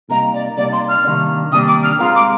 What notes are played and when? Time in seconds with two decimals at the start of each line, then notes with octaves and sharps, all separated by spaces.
0.10 C3 G3 A#3 D#4 A#5
0.34 D5
0.57 C3 G3 A#3 D#4 D5
0.73 C6
0.89 F6
1.05 C3 D#3 G3 A#3 D4
1.52 C3 D#3 G3 A#3 D4 D#6
1.67 D6
1.83 F6
1.99 G#3 C4 F4 A#4 F6
2.15 D6